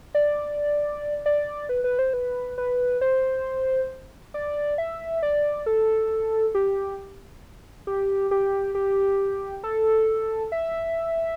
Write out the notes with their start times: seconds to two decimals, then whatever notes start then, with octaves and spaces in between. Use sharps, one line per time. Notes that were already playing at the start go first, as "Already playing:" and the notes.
0.15 D5
1.26 D5
1.69 B4
1.84 B4
1.99 C5
2.13 B4
2.58 B4
3.01 C5
4.34 D5
4.78 E5
5.23 D5
5.66 A4
6.55 G4
7.87 G4
8.31 G4
8.75 G4
9.64 A4
10.52 E5